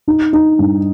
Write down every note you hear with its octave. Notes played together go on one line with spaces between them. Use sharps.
D#4
D#4
G2